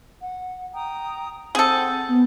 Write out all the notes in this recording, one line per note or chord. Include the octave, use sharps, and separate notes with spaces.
F#5
G5 A#5 D#6
C4 G#4 A4 F#5 G6
B3